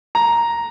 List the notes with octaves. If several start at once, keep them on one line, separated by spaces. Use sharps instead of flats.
A#5